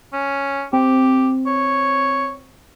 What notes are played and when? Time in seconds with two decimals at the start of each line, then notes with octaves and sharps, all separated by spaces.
0.13 C#4
0.73 C4 G4
1.46 C#5